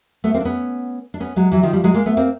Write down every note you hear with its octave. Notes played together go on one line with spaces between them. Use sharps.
A3 B3
A#3 C4
D4
B3 C#4
D4
B3 C#4
F#3 G#3
E3 F#3
D#3 F3
F3 G3
F#3 G#3
G#3 A#3
A3 B3
A#3 C4